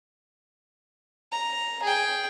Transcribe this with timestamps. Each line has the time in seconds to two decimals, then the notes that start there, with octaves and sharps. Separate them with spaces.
1.32 A#5
1.83 G#4 G5